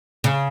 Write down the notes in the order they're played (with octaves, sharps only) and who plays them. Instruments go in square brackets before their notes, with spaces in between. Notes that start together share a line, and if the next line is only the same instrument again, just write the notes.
[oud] C#3